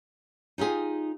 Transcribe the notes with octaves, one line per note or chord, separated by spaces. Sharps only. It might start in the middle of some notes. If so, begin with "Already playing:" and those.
D#4 F4 G4 G#4